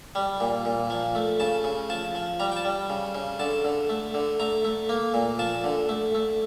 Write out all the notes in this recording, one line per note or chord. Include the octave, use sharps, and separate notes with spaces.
G3
A#2
A#2
F3
A3
C#3 A5
C#3
F3 A5
F3
G3 A#5
G5
A5
G3
C#3
C#3
D3 A5
D3
A3
D3
A3 A#5
A3
A#3
A#2
F3 A5
D3
A3
A3